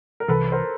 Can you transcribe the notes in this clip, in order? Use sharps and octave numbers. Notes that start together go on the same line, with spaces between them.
A#4
C2 C3 E3 A4 B4
A#4 C5